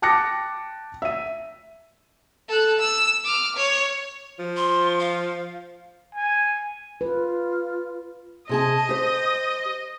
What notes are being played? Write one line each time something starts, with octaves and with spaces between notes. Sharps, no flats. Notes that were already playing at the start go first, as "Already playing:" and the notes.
G5 A5 D6 F#6 A#6 C#7
E5 D#7
A4 F#6
E6
D6 F6
C#5
F3
C6
F5
G#5
F4 B4
C3 G#4 D#5 A5
G4 C5